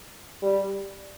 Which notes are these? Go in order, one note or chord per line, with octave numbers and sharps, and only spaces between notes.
G3